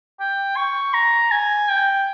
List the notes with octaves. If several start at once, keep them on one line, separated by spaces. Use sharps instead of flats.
G5
C#6
A#5
G#5
G5